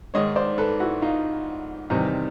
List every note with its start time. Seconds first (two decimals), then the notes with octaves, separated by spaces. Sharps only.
0.14 G#2 D#3 G#3 C#5 D#5
0.36 C5 D5
0.58 A4 B4
0.80 E4 F#4
1.02 D#4 F4
1.90 E2 C3 D#3 G3 C4 D#4